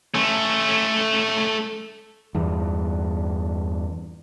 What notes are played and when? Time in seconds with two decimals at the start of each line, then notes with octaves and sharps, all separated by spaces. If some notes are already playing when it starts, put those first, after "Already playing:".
0.14 A3 C#4
2.35 E2 G2